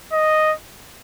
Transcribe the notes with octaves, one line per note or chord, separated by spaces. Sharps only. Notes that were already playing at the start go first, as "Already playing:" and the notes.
D#5